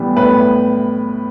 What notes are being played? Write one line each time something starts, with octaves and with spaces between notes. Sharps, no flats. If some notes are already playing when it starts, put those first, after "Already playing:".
Already playing: A2 E3 G3 B3
A2 B4